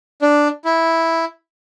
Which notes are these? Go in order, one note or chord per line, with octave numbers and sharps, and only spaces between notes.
D4
E4